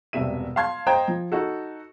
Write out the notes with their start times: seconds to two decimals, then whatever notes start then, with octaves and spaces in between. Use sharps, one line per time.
0.13 E1 G2 C3 E5 D#7
0.56 F5 A5 C6 G#6
0.87 C5 D#5 G5 A#5 G#6
1.08 F3
1.32 D#4 F#4 A4